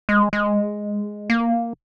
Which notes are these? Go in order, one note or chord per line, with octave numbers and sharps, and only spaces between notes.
G#3
G#3
A#3